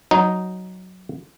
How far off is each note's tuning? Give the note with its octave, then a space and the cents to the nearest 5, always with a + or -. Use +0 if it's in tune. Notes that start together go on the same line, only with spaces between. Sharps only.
F#3 +0 D#4 +0